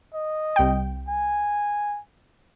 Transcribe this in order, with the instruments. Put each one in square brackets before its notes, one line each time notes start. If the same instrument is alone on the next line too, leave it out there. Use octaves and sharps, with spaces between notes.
[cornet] D#5
[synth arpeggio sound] C2 G5
[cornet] G#5